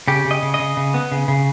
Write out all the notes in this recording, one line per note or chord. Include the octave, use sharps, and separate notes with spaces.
C#3 G4
C#3
D#5
C#3
D#5
C#3
C#3
B3
C#3
C#3